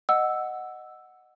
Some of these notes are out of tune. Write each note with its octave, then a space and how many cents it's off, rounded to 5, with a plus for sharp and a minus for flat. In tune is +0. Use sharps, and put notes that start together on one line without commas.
D#5 -10 F#5 +0 E6 +0